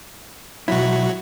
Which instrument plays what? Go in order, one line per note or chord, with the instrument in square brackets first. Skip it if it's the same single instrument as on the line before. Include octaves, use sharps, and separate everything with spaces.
[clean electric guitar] B2 E4 [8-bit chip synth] F#3 F#4